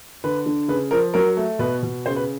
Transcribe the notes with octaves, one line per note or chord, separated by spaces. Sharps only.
D3 B4
D3
C#3 B4
F3 A#4
F#3 A#4
A3
B2 B4
B2
C#3 C5
B4